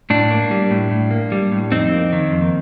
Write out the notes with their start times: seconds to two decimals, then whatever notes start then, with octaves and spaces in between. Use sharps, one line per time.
0.10 A2 D4
0.30 A#3
0.51 G3
0.71 A2
0.91 A2
1.11 A#3
1.32 G3
1.52 A2
1.72 F2 C4 D#4
1.92 A#3
2.13 D#3
2.32 F2